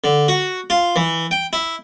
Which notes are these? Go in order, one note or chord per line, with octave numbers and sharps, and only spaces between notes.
D3
F#4
F4
E3
G5
E4